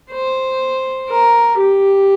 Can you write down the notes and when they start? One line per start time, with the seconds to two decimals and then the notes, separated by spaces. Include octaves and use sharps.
0.11 C5
1.09 A#4
1.59 G4